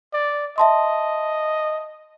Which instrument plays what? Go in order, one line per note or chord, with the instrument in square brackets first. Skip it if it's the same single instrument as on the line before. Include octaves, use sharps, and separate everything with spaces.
[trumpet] D5
[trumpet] D#5 [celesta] E5 A5 C6